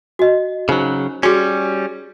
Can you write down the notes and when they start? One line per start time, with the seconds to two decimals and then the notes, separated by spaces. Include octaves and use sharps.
0.19 F#4 D#5
0.69 C#3 F#3 D#4 C5
1.23 G3 C#4 F#4 G#4 D6